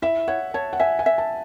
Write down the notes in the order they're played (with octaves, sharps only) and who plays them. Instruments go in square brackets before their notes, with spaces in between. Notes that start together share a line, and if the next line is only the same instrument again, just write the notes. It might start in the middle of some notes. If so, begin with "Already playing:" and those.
[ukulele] E4 [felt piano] E5
[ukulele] C#5 [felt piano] F#5
[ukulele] C#5 [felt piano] A5
[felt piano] F#5
[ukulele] E5 [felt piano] G#5
[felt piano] G#5
[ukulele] E5
[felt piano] A5